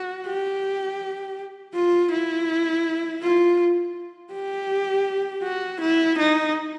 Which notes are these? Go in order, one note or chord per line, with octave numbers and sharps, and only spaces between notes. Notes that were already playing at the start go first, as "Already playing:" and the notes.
Already playing: F#4
G4
F4
E4
F4
G4
F#4
E4
D#4